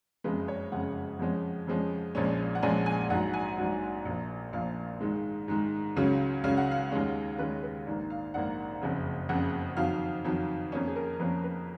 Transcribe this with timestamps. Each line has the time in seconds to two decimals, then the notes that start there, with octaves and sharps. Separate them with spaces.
0.24 F#1 F2 C#3 G#3 B4
0.48 C#5
0.72 F#1 F2 C#3 G#3 F#5
1.19 F2 F3 G#3 C#4
1.67 F2 F3 G#3 C#4
2.15 A#1 A#2 F3 G#3 C#4
2.55 F#5
2.63 A#1 A#2 F3 G#3 C#4 G#5
2.86 G#5
3.10 A#1 G#2 F#3 F#5
3.34 G#5
3.58 A#1 G#2 F#3
4.05 A#1 A#2 F3 A#3
4.53 A#1 A#2 F3 A#3 F5
5.00 G#2 D#3 G#3
5.48 G#2 D#3 G#3
5.96 C#2 C#3 F#3 C#4
6.44 C#2 C#3 F#3 C#4 F5
6.57 F#5
6.72 F5
6.92 D#2 D#3 G#3 C#4
7.39 D#2 D#3 G#3 C#4 B4
7.63 B4
7.87 A#1 G#2 D#3 A#3
8.10 F5
8.34 A#1 G#2 D#3 A#3 F#5
8.82 F#1 F2 C#3
9.29 F#1 F2 C#3 F#5
9.77 F2 D#3 F#3 F5
10.25 F2 D#3 F#3
10.72 F2 F3 A#3 C#4
10.87 G#4
10.96 A#4
11.20 F2 F3 A#3 C#4 B4
11.44 B4